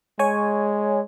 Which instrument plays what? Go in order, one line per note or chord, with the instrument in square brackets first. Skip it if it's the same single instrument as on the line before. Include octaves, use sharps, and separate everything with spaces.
[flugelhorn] G#3 [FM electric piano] C#5 G#5